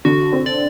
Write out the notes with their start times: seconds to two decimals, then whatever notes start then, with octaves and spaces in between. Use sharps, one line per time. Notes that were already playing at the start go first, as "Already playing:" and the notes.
0.05 D3 F#4
0.32 C4
0.46 D5